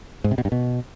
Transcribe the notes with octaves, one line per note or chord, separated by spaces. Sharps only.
G#2
C3
B2
G2
B2